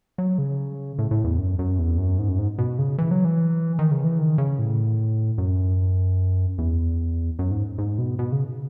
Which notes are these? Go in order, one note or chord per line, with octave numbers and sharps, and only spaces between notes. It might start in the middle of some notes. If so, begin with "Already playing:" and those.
F#3
C#3
A2
A2
E2
F#2
F#2
E2
F#2
G#2
F#2
G#2
B2
C#3
E3
F#3
E3
D#3
C#3
E3
D#3
C#3
A2
F#2
E2
F#2
G#2
G#2
B2
B2
C#3